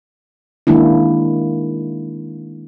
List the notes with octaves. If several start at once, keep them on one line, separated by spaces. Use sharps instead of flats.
D#3 G#3 A#3 D4 E4